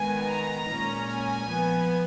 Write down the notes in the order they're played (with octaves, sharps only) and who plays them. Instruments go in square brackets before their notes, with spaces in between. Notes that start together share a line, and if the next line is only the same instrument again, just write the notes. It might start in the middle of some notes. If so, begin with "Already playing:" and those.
Already playing: [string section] D#3 G#3 B3 G#5
A#5
A#2 G#3 C#4
G#5
F3 B3